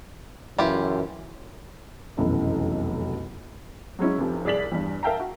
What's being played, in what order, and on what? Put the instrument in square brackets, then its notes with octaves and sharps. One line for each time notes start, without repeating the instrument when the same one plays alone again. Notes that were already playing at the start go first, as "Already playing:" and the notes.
[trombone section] C#2 F#2 E3 [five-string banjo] E4 F4 G4
[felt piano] F1 B1 F#2 E3 D#5
[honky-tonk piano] F#3 G#3 C#4 E4
F1 C3 F3
C2 G#4 D5 B6 F#7
E2 G2
A#4 E5 F5 G5 A5 A#5
F#4